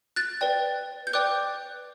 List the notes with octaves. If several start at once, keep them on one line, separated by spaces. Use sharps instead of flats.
F#6 A6
B4 D5 G5
G6
B4 D5 G5 D6 F#6